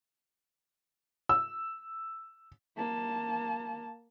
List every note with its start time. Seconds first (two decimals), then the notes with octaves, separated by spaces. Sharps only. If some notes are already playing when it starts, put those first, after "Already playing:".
1.29 E6
2.77 A#3 A5